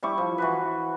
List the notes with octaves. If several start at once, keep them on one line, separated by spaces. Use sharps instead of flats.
G3 E4 C#6 D6
F3
E3 F#4 B4